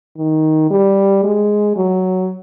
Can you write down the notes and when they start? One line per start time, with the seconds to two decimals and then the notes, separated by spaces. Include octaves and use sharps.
0.18 D#3
0.70 G3
1.24 G#3
1.76 F#3